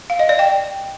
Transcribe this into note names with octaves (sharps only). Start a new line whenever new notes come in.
F5
D#5
D5
G5